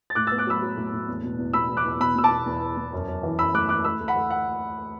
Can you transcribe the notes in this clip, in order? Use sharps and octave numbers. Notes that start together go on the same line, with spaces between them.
A6
A2 D6 F#6
E6 A6
B3
D6 F#6
F#3 B5 E6
F#3
A2
A2
E2
B2
E2
B2 B5 E6
E2
D6 F#6
E2
B2 B5 E6
B2 E6
A5 D6
B2
E2
E2
E2
F#2
F#2
E3
F#2 B5 E6
A3 D6 F#6
E3 D6 F#6
A3 B5 E6
D2
F#5 B5
A3
F#5